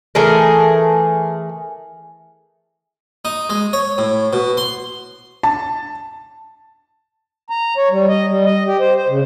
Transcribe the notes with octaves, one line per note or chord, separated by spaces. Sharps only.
E3 A3 G#4 A#4
D#4
G#3
C#5
A2
B2
C6
A5
A#5
C#5
G3
D#5
G3
D#5
G4
C5
C5
C#3